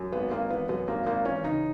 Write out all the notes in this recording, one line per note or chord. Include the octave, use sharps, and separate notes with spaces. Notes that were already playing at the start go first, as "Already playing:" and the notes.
Already playing: F#2
G#1 B3
G#1 A#3
E3 B3
F#2 B3
G#1 A#3
G#1 A#3
E3 C#4
C#3 D#4